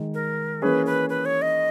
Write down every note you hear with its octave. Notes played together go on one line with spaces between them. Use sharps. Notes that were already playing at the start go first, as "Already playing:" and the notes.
Already playing: D#3 G#3 D#4 G#4
A#4
E3 A#3 C#4 G#4 B4
B4
B4
C#5
D#5